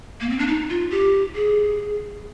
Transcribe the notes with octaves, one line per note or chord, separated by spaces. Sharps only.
A#3
C4
D4
D#4
F4
G4
G#4